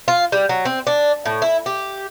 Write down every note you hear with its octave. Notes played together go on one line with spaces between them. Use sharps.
F4
G3
F#3
C4
D4
A2
E4
G4